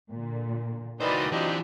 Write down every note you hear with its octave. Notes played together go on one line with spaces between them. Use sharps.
A#2 D3
C#2 D#3 E3 F#4 B4 C5 D5 D#5
E3 C4 D4 D#4 F4 G4